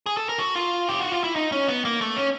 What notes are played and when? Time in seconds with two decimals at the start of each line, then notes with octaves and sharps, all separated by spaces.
0.06 G#4
0.17 A4
0.29 A#4
0.39 F#4
0.56 F4
0.89 G4
1.01 F#4
1.12 F4
1.24 E4
1.36 D#4
1.52 C#4
1.68 B3
1.85 A#3
2.01 A3
2.17 C#4